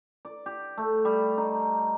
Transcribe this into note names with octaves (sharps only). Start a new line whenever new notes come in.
D5
G4
A3
G3
D#4